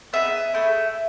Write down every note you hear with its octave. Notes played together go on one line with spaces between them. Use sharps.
B3 D#4 G#4 E5
A3 E4 G#4